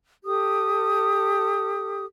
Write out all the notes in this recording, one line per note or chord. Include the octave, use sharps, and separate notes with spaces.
G4 A4 D#6